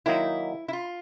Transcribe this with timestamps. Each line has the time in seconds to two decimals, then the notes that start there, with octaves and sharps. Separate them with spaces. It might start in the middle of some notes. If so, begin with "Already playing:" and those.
0.06 D#3 F#3 A#3 D#4 E4
0.68 E4
0.73 F4